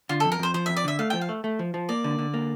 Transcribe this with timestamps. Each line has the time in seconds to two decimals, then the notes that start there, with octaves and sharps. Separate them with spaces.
0.09 D3 F4
0.20 F2 A4
0.32 A#4
0.39 F2 C5
0.54 F3 C5
0.66 F2 E5
0.76 D5
0.84 D3 E5
0.99 A3 F5
1.10 F3 G5
1.21 F5
1.29 A3
1.44 A3
1.59 F3
1.74 F3
1.89 A#3 D5
2.04 D3
2.19 D3
2.34 A#3